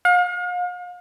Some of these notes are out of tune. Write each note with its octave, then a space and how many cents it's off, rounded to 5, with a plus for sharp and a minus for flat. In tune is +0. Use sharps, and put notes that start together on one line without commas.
F5 +40